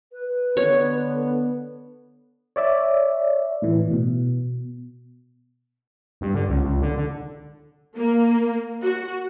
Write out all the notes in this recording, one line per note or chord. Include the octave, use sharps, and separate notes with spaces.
B4
D3 B3 C#5
C#5 D5 E5
A2 E3
B2
G2
D3
C#2
C#2
D3
D3
A#3
F#4